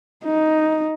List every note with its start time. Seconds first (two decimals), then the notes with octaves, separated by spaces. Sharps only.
0.25 D#4